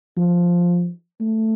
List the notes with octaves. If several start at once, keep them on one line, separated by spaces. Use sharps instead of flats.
F3
A3